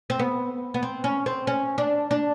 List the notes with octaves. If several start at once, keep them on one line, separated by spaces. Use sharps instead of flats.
C4
B3
B3
C4
C#4
C4
C#4
D4
D4